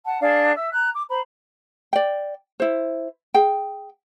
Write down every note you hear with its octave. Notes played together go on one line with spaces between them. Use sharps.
F#5 A5
D4 G#4 F5
E5 E6
A#5 F#6
D6
C5 A#5 B5
D5 G5
E4 C5
G#4 G5